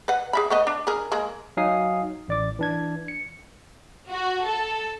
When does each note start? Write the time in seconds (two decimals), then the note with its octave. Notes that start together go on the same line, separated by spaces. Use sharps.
0.08 B4 F#5
0.33 G#4 E5 B5
0.50 A3 B3 D#5
0.67 D4
0.87 G#4 A#4
1.12 G#3 A#3 G#4
1.57 F#3 D#4 F5 G#5 D#6 C7
2.28 A1 D5 D6
2.59 E3 D4 G#6
3.08 C#7
4.10 F#4
4.44 A4